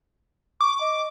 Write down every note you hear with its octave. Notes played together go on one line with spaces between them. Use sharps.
C#6 D6
D#5